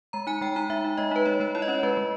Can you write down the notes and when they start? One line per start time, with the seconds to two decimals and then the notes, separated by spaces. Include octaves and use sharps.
0.13 G#3 A#5
0.27 D#4 G#5
0.41 G#3 G5
0.56 D#4 A#5
0.70 G#3 E5
0.84 D#4
0.97 G#3 D#5
1.11 D#4 B4
1.26 G#3 C#5
1.40 G#3 C#5
1.55 E4 C#5
1.62 D#5
1.68 C#4 C#5
1.83 G#3 B4
1.97 G#3